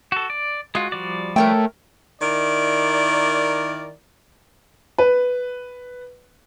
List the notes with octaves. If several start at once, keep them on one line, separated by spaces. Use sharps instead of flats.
F#4 A4
D5
G#3 F4 F#4
F3 G3 D5
A3 A#4 C#5 G5
D#3 E4 A#4 D5
B4